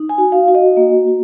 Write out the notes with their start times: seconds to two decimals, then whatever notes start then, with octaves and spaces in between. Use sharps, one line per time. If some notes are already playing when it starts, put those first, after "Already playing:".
Already playing: D#4
0.09 G#5
0.18 F#4
0.32 F5
0.48 F#4
0.55 D#5
0.77 A#3
1.08 F#4